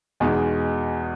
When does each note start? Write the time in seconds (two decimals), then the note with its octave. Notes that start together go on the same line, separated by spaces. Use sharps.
0.20 E2 B2 G#3 D#4